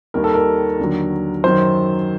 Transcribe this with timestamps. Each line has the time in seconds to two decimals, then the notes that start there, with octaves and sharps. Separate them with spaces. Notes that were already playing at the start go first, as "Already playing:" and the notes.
0.14 D#2 D#3 G3 A#4
0.24 A4
0.34 A#4
0.79 D#2 D3 F#3
1.44 F#2 D#3 F#3 C5